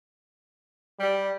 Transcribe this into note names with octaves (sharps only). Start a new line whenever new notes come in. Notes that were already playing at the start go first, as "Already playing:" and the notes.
G3